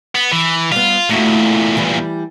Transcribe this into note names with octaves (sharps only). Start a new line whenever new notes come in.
B3
E3
G3 B3 F4
E2 A#2 A3 E4 F#4
E3 G3 B4